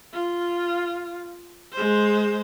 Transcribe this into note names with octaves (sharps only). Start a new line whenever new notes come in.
F4
G#3 C5